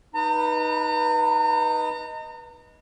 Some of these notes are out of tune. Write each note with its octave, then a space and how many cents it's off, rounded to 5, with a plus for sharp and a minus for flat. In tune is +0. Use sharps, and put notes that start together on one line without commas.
D#4 +0 B4 -20 A#5 -40